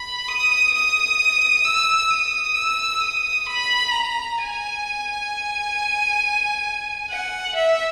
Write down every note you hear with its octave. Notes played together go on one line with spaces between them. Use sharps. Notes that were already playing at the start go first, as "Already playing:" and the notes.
Already playing: B5
D#6
D#6
E6
D#6
E6
D#6
B5
A#5
G#5
F#5
E5